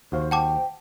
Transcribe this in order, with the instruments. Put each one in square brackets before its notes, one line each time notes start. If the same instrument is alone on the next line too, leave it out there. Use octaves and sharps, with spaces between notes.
[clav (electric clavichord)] D#2 F#4 F5 [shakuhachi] C5
[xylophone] F#5 A5 D6 [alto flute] G5